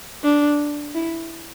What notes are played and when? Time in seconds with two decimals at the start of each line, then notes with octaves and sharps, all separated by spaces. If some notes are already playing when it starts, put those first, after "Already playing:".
0.24 D4
0.95 E4